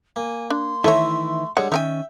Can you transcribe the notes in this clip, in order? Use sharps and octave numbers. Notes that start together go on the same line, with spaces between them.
A#3 G#5
D4 C6
D#3 E3 A3 E4 A4 C#5 E5 A#5
D3 G3 G#3 C#5 F#5
D#3 C#4 D#4 A#4 E5 G5 G#5